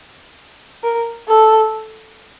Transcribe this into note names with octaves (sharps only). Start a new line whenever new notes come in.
A#4
A4